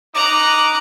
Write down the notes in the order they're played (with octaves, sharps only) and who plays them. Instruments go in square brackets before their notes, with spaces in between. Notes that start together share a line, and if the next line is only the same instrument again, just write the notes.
[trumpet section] D#4 D6 [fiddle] A#5 F#6